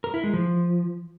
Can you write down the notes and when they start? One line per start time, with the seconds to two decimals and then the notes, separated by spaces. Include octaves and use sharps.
0.04 A#4
0.14 E4
0.24 G#3
0.33 F3